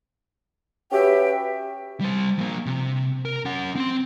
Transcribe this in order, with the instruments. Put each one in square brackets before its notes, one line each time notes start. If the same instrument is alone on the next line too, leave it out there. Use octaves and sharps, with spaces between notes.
[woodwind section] C#4 F#4 G4 B4 E5 G5
[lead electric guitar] G3 C5
F3 A#3
C3
A#4
C#4 F#5
C4 C6